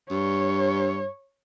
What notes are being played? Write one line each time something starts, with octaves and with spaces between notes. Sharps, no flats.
G2 C#5